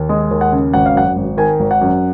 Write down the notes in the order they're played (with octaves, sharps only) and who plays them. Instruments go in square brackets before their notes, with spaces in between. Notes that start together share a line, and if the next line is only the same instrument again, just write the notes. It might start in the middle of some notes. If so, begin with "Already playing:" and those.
Already playing: [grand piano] D#2
G#3 D#5
D#2
F#5
C#3
G#1 F#5
F5
F#2 F#5
G#1
D#3 G#5
G#1
F#5
F#2